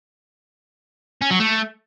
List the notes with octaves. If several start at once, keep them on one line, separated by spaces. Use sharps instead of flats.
C#4
F#3
A3